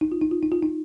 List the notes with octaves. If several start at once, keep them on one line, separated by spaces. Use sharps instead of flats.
D#4
F4
D#4
F4
D#4
F4
D#4